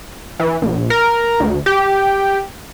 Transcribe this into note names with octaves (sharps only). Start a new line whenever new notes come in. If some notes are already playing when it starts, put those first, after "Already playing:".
E3
A#1
A#4
D2
G4